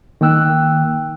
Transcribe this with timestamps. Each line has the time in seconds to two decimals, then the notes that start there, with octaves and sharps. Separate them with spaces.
0.21 D#3 A#3 G5 E6 F#6